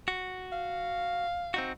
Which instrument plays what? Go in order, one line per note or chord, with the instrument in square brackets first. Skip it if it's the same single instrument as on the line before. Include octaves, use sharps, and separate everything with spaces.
[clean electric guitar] F#4
[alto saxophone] F5
[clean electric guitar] C4 D#4 F#4